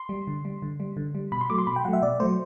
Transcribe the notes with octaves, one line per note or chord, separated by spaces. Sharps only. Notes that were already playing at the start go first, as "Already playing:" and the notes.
Already playing: C6
G3
D3
G3
D3
G3
D3
G3
B2 B5
C6
F#3 A3 D6
C6
B2 B5
G5
F#3 A3 F#5
E5
B2 D5
F#3 A3 C5